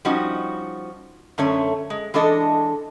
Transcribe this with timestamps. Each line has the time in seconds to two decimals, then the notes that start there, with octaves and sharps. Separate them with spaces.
0.05 F3 G3 C#4 D#4 F#4
1.38 F#2 D3 A3 C#4 C#5
1.90 G#3
2.14 E3 G#3 D4 A4 D#5